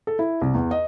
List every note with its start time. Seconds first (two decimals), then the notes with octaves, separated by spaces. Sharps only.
0.07 A4
0.19 E4
0.41 C2
0.54 E2
0.71 D#5